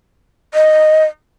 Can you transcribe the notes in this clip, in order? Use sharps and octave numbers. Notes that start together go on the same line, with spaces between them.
D#5